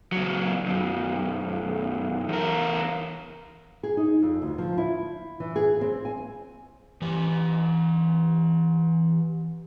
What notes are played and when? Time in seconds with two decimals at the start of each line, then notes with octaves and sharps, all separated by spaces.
0.12 C#2 F#3
0.66 B1 F#2
2.29 E2 A#4
3.83 G#4
3.97 D#4
4.23 F2
4.42 D2
4.58 F3
4.78 E4
5.40 E3
5.56 G#4
5.81 C4
6.05 G#5
7.02 E3 G4